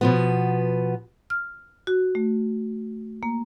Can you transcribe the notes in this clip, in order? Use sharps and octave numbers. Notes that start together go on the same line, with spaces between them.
B2 F3 B3
F6
F#4
A3
A#3